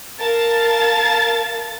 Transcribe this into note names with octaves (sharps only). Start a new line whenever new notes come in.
A#4 F5 A5 A6